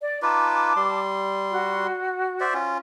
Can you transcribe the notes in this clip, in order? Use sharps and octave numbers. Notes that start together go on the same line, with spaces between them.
D5
D#4 F4 B4 A5 D6
G3 C6
F#4
C5 D5 E5
C#4 F4